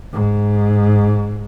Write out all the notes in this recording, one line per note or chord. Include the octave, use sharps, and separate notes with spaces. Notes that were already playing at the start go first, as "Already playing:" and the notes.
G#2